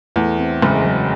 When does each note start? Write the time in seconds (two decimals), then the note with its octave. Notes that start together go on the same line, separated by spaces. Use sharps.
0.16 E2 A3
0.39 C4
0.62 F#1 G#3
0.85 F#3